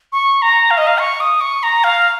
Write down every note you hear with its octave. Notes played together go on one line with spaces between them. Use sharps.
C#6
A#5
F5
D#5
F5
C#6
D#6
C#6
A#5
F5